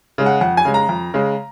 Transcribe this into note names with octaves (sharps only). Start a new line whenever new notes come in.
C#3 G#3
F#5
F2 F#5
G#5
C#3 G#3
A#5
F2
C#3 G#3